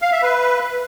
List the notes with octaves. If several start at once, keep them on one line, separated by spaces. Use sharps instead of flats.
F5
E5
B4